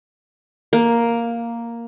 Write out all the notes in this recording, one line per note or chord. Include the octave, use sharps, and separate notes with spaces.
A#3